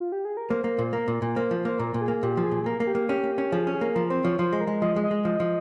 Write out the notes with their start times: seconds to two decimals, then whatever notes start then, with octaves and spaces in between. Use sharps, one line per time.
0.00 F4
0.12 G4
0.25 G#4
0.37 A#4
0.50 A#3 C5
0.64 A#3
0.78 A#2
0.93 A#3 A#4
1.08 A#2
1.22 A#2
1.36 A#3 C5
1.51 F3
1.65 A#3 C5
1.79 A#2 A#4
1.94 A#2
2.01 G#4
2.08 A#3
2.23 A#2 G4
2.37 F3
2.44 G#4
2.51 A#2
2.66 A#3 A#4
2.80 A#3
2.87 G4
2.95 A#3
3.09 C#4 G4
3.24 A#3
3.38 C#4
3.52 F3 G#4
3.67 C#4
3.74 G#4
3.81 A#3
3.95 F3 A#4
4.10 C4 C5
4.24 F3 C#5
4.39 F3 C5
4.53 G#3
4.61 A#4
4.67 G#3
4.82 F3 D#5
4.96 G#3
5.03 D#5
5.11 G#3
5.25 F3
5.40 F3